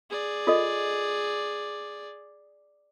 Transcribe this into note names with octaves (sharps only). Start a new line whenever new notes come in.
G#4 D5
F4 A4 D#5